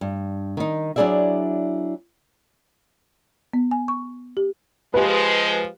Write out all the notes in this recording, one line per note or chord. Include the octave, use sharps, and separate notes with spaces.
G2
D#3 D#4
F#3 D4 E4 G#4 D5 E5
B3
G#5
C#6
G4
F3 G#3 G4 B4